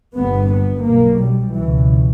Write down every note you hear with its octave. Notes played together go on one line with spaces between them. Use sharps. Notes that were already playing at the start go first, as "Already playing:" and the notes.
G1 G2 B3
B3
B1 B2 A#3
G3
C#2 B2 E3